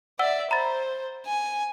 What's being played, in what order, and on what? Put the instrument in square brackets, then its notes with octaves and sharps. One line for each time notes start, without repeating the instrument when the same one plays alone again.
[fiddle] D5 E5 [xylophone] F#5 E6 G7
[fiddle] C5 [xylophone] A#5 B5 A6
[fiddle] G#5